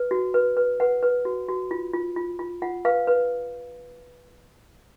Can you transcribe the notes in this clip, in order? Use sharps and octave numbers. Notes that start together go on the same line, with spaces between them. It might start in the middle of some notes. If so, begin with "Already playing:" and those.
Already playing: B4
F#4
B4
B4
B4 F#5
B4
F#4
F#4
F4
F4
F4
F4
F4 F#5
B4 F5
B4